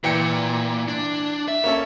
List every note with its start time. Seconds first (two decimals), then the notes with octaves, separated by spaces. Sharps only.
0.04 A#2 E3 G5 C#7
0.88 D4
1.48 E5
1.64 A#3 C#4 A4